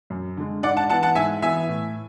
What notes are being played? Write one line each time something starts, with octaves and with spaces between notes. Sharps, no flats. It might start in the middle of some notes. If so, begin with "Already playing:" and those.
F#2
D3 G#3
G#2 D5 F#5
F#5 A5
E3 B3 F#5 A5
F#5 A5
G#2 E5 G#5
E3 B3 E5 G#5
A2